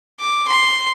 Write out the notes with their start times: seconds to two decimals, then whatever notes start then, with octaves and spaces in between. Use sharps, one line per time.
0.20 D6
0.48 C6